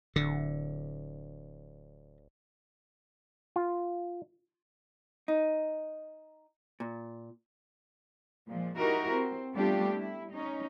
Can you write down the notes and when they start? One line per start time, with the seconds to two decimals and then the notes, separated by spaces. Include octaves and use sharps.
0.16 D1 D3
3.56 F4
5.28 D#4
6.80 A#2
8.48 A#2 F3 G#3
8.78 D#4 E4 F#4 G4 A#4
9.11 C4
9.55 G3 A3 B3 D4 F4 G4
9.96 E4
10.34 C#4 D#4